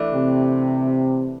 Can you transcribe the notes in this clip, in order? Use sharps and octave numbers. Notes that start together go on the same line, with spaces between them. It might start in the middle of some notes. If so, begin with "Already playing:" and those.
Already playing: E3 A3 D4
C3